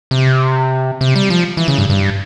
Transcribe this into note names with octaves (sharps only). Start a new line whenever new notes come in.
C3
C3
G3
F3
E3
C#3
G2
G2